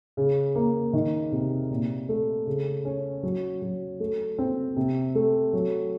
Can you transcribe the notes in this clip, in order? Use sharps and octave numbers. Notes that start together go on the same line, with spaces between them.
C#3
A#3
D#3
C3
A#2
A3
C#3
C#4
F#3
F#3
A3
C4
C3
A3
F#3